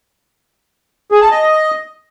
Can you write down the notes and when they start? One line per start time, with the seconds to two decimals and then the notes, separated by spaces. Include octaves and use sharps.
1.12 G#4
1.21 A5
1.31 D#5